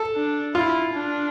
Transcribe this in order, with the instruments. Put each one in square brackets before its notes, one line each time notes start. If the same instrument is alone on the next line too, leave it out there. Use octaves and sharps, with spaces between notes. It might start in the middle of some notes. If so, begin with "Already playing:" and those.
Already playing: [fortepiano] A4
[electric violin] D4
[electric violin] E4 [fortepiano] F4
[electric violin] D4